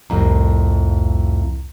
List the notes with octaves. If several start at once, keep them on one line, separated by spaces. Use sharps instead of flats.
C2 F2 A2 A#5